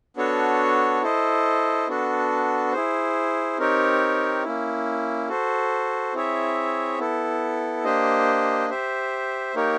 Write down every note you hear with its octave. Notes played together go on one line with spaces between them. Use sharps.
B3 D4 F#4 A4 C#5
E4 A4 C5 D#5
B3 D4 F#4 A4
E4 G#4 C5
C4 D#4 G4 A#4 C#5
A#3 C#4 E4
F#4 A4 C5
C4 E4 G#4 C#5 E5
B3 E4 A4
A#3 D4 G4 C5 D#5
G4 C5 E5
A#3 D#4 G4 A#4 C#5